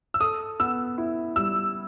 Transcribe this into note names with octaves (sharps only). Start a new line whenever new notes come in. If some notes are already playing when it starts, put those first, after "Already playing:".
E6
A4 D#6
B3 E6
E4
G3 E6